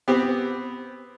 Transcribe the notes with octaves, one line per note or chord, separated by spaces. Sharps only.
B3 C4 G4